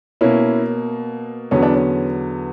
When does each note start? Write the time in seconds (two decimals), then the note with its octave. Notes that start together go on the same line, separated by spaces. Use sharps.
0.21 B2 A#3 C#4 E4
1.51 E2 D3 F#3 B3 C#4
1.63 D4
1.73 C#4